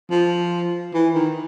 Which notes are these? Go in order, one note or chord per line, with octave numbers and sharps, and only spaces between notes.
F3
E3
D#3